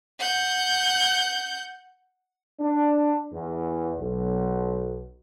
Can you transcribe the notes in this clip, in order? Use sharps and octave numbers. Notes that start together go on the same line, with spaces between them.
F#5 G6
D4
E2
B1